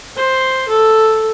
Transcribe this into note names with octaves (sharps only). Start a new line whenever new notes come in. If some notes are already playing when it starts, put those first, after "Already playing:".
C5
A4